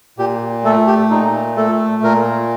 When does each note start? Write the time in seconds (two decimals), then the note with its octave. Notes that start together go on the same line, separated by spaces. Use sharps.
0.18 A#2 G4
0.64 A3 A4
0.87 G4
1.11 A#2 D#4
1.57 A3 A4
2.03 A#2 A#4